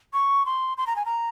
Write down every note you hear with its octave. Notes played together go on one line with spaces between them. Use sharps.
C#6
C6
C6
A#5
G#5
A#5